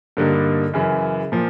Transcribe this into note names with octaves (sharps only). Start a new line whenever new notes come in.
G2 D3 G3 A#3 D#4
F#2 C#3 E3
A#2 F3